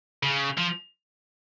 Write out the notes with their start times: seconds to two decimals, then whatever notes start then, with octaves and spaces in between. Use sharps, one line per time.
0.23 C#3
0.58 F3